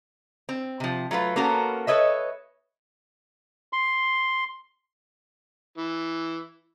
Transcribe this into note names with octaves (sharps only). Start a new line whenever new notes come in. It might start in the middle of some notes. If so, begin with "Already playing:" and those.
C4
C3 F3
F#3 A3 F4 B4
A#3 B3 C#4 F#4 A4 A#4
A4 B4 C#5 D#5 E5
C6
E3